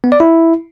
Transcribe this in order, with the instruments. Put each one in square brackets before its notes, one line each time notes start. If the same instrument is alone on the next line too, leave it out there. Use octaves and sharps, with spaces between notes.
[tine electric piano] B3
D5
E4